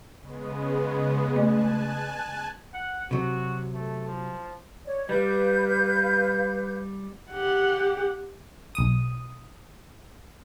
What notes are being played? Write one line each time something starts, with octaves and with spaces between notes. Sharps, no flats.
C#3 G#3 B3
A3 G#5 A5 F#6
F#5
C3 F#3 F#4
A3
F3
C#5 D5
G3 B4 F5 G6
G4 F#5
B1 D#6